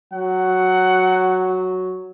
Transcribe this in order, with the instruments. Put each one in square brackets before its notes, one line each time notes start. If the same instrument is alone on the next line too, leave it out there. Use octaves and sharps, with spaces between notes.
[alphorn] F#3 [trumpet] F#5